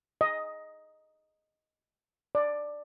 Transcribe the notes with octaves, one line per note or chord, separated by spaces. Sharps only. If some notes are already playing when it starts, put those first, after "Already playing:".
D#5
D5